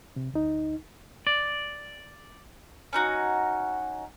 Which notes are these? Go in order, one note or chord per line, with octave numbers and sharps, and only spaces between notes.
C3
D2 D#4
D5
C#4 D#4 F#4